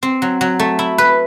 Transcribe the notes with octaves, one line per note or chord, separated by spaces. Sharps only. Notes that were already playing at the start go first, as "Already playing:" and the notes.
C4
F#3
F#3
A3
E4
B4